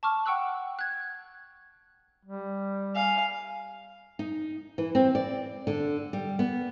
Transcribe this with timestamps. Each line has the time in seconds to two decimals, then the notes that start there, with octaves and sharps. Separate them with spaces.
0.03 A5 C#6 D6 F6
0.25 F#5 G5 C#6 E6 F#6 F#7
0.79 F#6 G#6
2.25 G3
2.95 F5 G#5
4.19 D#4
4.78 E3
4.95 C4
5.15 D5
5.67 D3
6.13 G3
6.39 B3